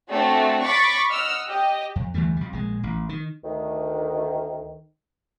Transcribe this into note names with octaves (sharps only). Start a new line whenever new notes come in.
A3 C4 D4 F#4
B5 C#6 D6 A6 B6
D#5 F#5 E6 F6
G4 D#5
F2
D2 E3 G3 A3
F2 G3
A#1 G#3
A1
D#3
D2 D#3